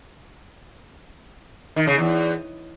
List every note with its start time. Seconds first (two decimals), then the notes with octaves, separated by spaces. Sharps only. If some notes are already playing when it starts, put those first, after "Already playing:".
1.76 D#3
1.87 C#3
1.98 E2